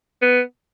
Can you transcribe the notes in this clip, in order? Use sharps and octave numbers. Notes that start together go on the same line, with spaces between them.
B3